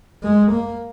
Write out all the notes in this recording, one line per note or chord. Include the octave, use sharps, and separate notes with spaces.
G#3
A#3